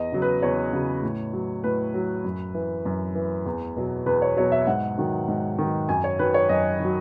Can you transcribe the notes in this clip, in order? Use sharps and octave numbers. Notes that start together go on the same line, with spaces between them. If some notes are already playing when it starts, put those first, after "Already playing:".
Already playing: E2 D#5
C#3 F#3
B4
E2 C#5
C#3 F#3
A2
F#3
A2 B4
F#3
F#2
E3
F#2
E3
E2
B2 F#3
E2 B4
C#5
B2 F#3 C#5
E5
G#2 F#5
D#3 F#3
G#2
D#3 F#3
F#2 G#5
C#5
D#3 F#3 B4
C#5
F#2 D#5
D#3
F#3